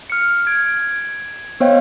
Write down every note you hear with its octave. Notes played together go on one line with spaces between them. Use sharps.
F6 C#7
G#6 D7
B3 C5 C#5 D#5 F5 G5